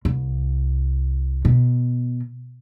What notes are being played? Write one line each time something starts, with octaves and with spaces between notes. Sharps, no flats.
C2
B2